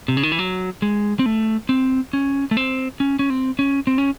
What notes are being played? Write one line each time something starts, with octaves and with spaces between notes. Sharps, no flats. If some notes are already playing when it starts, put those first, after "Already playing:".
C3
C#3
D#3
E3
F#3
G#3
C4
A3
C4
C#4
A3
C4
C#4
C#4
C4
C#4
C4
C#4